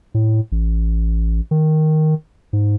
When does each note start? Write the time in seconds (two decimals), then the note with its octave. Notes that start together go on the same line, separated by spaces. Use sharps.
0.14 A2
0.52 A1
1.51 D#3
2.53 G#2